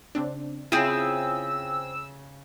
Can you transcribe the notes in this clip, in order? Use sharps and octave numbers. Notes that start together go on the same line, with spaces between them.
C#3 C4 D4
C#3 C4 E4 F4 G#4 E6